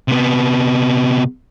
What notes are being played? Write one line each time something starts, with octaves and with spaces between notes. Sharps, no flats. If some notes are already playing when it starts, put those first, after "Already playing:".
C3 B3